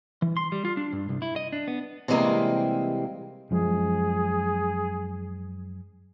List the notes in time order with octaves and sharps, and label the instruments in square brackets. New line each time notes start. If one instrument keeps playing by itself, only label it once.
[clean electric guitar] E3
C6
G3
F4
D4
G2
C2
E4
D#5
D4
B3
[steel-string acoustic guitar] C3 E3 G3 G#3 A#3 C4
[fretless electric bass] F#2 F3 G#3 [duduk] G#4